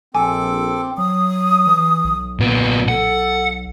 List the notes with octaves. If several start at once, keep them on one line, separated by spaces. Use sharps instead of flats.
A#1 C4 A4 G#5 D6
F#3 D#6
E3
B1
A#2 B3
A4 F#5